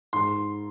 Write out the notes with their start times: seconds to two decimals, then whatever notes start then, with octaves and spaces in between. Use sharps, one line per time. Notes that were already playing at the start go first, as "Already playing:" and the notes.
0.13 G#2 C6